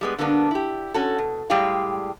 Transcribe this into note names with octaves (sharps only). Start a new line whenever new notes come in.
G3 G#3 B3
D3 G3 A#3 B3 D4
E4 G4
C#4 F#4 A4
B2
A2 G3 G#3 G4 G#4 F5